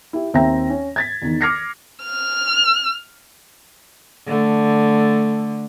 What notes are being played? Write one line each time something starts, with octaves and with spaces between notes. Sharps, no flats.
E4 G4
D#2 C4 E5 G5 A#5 A#6
C#4
G#6 A6 B6
E2 D#3
D6 F6 G#6 A#6 C7 C#7
F6
D3 A3